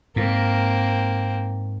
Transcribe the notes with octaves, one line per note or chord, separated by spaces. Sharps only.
G#2 A#3 C4